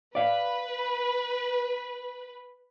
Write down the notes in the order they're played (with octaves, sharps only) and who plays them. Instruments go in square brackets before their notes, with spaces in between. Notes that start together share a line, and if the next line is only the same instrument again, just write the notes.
[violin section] B4 [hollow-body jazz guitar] D5 F5